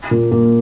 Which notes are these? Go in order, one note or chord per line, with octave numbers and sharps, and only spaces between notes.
A#2 A#3
A#2 A#3